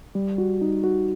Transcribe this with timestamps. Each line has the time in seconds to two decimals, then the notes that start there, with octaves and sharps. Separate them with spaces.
0.15 G3
0.38 F#4
0.61 D#4
0.84 F#4